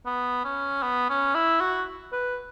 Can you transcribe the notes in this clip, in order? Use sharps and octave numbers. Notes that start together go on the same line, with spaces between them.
B3
C#4
B3
C#4
E4
F#4
B4